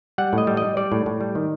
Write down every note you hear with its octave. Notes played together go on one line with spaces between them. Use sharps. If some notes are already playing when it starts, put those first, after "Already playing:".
G3 F#5
A2
D#5
G3
G3 D#5
G3 D5
A2
A2
G3
D#3